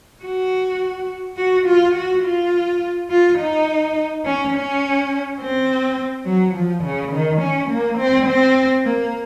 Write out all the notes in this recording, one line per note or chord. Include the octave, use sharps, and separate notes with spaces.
F#4
F#4
F4
F#4
F4
F4
D#4
C#4
C#4
C4
F#3
F3
C#3
D#3
C#4
A#3
C4
C4
A#3